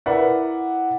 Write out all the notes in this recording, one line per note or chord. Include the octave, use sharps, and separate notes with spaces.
E4 A#4 B4 D5 E5 F#5